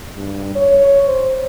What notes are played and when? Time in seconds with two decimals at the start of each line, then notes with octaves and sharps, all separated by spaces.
0.15 G2
0.55 C#5
1.08 C5